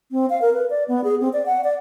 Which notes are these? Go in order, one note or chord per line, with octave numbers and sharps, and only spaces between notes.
C4
F5
A#4
B4
D5
B3
G#4
C4
D5
F#5
D5